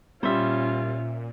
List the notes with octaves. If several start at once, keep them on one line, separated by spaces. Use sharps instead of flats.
A#2 G3 C#4 F4 C5 E5